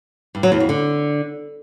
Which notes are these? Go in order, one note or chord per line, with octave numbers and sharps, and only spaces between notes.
G2
F#3
E2
F2
D3